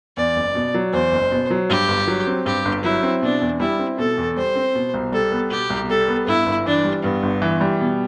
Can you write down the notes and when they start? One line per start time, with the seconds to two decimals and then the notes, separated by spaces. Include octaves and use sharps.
0.17 E2 D5
0.36 F#1
0.55 B2
0.74 F#3
0.93 E2 C5
1.12 F#1
1.32 B2
1.50 F#3
1.69 G2 G4
1.88 G1
2.07 F#3
2.27 C4
2.46 G2 G4
2.65 G1
2.83 F#3 E4
3.03 C4
3.22 B2 D4
3.41 E2
3.60 G3 E4
3.79 C4
3.98 B2 A4
4.18 E2
4.36 G3 C5
4.55 C4
4.75 B2
4.94 C2
5.12 G3 A4
5.32 B3
5.51 B2 G4
5.70 C2
5.89 G3 A4
6.08 B3
6.27 G2 E4
6.46 G1
6.66 E3 D4
6.84 G3
7.03 G2 B3
7.23 G1
7.42 E3
7.61 G3
7.80 B2